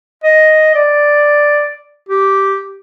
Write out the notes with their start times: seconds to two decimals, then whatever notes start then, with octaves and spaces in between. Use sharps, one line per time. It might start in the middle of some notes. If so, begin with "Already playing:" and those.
0.24 D#5
0.75 D5
2.09 G4